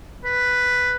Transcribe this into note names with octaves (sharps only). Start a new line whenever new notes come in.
B4